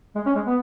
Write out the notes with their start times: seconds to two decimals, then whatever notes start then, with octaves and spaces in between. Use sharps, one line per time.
0.15 G#3
0.26 C#4
0.35 G#3
0.46 B3